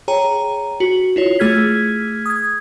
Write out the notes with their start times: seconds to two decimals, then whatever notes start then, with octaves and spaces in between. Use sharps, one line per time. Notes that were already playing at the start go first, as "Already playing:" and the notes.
0.08 G#4 C#5 G5 A#5
0.80 F#4
1.16 E4 F4 C#5
1.39 A3 G#4 F6 G#6 B6
2.26 D#6 G#6